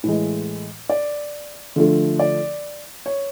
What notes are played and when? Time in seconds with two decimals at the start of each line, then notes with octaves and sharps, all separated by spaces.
0.04 A2 E3 G#3
0.89 D5
1.76 D3 F3 A3
2.19 D5
3.06 C#5